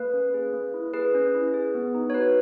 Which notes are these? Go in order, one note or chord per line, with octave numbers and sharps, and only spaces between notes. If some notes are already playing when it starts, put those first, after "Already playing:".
Already playing: A#3 B4
C#4
G#4
A#3
E4
G#4 B4
C#4
E4
G#4
B3
D#4
C#5
F#4 B4